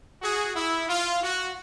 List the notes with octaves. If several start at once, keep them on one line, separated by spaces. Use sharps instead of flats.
F#4 G#4
E4
F4
F#4